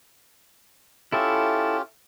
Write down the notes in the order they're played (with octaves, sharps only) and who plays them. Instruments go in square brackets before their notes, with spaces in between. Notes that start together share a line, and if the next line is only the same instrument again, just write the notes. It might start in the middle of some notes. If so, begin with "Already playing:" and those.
[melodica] C#4 F4 G4 [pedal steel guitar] E4 A4 E5